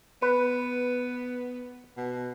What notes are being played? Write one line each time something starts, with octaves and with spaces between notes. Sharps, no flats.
B3 B4
B2